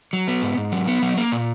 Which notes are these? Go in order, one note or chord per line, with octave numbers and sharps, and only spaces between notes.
F#3
B3
G#2
G#2
F#3
B3
F#3
A#3
A#2